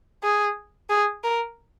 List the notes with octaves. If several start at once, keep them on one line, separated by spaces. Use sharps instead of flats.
G#4
G#4
A#4